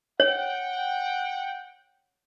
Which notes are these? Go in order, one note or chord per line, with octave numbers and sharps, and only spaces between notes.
C#5 F#5 G5